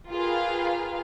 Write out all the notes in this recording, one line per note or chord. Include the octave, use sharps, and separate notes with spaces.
F4 G4 G#4 A#4 B4 F5